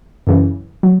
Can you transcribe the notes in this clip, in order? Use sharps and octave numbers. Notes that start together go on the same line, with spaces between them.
F#2 C#3 E3
F#3